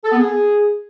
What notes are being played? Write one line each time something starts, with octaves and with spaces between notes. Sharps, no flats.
A4
B3
G#4